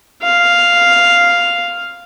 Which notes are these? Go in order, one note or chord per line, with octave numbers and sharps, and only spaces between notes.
F5